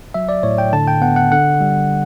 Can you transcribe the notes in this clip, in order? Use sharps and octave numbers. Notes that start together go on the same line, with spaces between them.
F#3 E5
D5
A2 C#5
G5
D3 A5
G5
B3 F#5
F#5
D3 F#5
G3